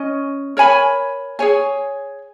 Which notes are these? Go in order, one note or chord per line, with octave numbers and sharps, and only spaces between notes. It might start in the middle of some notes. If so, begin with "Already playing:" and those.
Already playing: C#4 D#5
A#4 C#5 G#5 B5
G#4 C#5 G#5